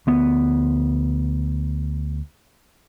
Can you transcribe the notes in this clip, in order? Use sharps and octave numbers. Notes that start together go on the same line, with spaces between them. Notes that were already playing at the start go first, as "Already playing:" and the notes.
D2 B3